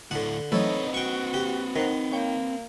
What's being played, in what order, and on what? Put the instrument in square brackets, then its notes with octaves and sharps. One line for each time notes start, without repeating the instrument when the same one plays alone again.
[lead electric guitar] D2 A2 [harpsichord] D3 F#5
[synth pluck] E3 F#3 A3 [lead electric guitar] C4 B4 [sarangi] D#4 [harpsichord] A4 C#5
[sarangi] F#4 [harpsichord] G5 C#6
[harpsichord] G4
[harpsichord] D#3 [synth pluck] A#4 C5 F#5
[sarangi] A#3 [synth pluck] C#5 G5